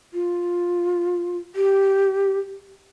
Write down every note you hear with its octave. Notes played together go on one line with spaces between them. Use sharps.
F4
G4